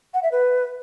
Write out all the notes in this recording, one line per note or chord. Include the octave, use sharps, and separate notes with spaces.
F#5
E5
B4